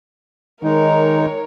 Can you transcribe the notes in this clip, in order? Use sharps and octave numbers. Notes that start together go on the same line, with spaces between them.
D#3 G#3 D#4 A#4 C#5